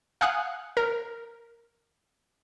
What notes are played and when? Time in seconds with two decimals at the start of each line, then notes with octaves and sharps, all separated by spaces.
0.21 F5 F#5 G#5 D#6 F#6
0.77 A#4